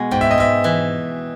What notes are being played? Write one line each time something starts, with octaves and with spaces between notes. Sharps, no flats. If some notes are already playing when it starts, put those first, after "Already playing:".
Already playing: B2 G#3 B3
G#2 G5
E5
D#5
G#2 E5
E3